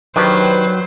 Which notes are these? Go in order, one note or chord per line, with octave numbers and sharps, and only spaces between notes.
D#3 F#3 D4 G4 B4 C5